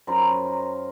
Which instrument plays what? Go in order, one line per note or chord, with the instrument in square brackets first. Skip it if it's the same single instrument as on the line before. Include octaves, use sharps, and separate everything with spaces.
[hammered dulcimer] F#2 A#4 C5 B5